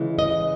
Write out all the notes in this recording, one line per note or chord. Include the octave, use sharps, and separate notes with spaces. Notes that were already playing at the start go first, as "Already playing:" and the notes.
Already playing: C#3 E3 G#3
D#5